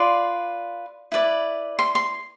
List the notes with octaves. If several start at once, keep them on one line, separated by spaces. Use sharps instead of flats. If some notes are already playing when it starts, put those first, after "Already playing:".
Already playing: F4 B4 D5 C6
E4 B4 D5
C6
C6